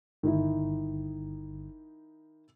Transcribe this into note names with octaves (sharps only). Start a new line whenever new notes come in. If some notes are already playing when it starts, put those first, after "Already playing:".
G1 D#3 D#4 E4